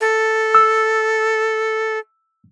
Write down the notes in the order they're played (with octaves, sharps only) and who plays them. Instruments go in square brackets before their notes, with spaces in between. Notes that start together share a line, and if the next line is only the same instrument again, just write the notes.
[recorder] A4
[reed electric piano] E6